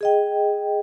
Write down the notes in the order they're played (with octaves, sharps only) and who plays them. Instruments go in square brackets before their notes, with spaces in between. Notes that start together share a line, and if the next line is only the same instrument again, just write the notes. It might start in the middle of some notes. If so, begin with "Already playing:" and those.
[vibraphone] G#4 D#5 G5